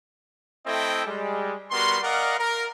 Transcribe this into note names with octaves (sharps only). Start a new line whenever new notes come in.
A3 C4 E4 A4 D#5 G5
G3 G#3
G3 B3 F#4 A#4 C6
A#4 D5 D#5 F5 F#5
A#4